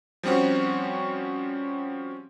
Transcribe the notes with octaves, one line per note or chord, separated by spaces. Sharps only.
F3 G3 C4 C#4 F#4